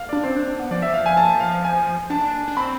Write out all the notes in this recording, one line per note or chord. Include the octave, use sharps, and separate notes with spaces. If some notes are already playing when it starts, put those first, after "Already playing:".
Already playing: F5
D5
D4
C4 C5
D4
D4
B3
F3 D5
E5
F5
G#5
A5
F5
G#5
D4 A5
D4
C4 B5